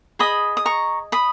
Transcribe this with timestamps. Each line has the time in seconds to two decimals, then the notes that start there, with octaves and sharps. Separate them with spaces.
0.19 G#4 D#5 B5 D#6
0.57 D#6
0.66 A#5 C#6
1.12 B5 D#6